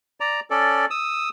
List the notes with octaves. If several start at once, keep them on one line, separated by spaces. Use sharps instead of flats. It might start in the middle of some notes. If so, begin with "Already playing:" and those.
D5 A#5
C#4 A4 D5
D#6 E6